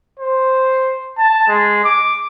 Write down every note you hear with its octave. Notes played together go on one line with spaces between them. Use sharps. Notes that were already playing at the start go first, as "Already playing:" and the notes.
C5
A5
G#3
D6